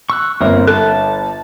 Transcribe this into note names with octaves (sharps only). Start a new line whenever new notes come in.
C#6 E6 F#6
G1 A#3 C4 A#4
A4 A5